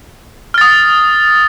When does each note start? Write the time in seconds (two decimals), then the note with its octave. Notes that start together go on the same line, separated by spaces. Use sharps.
0.54 F6
0.58 A6
0.61 D#6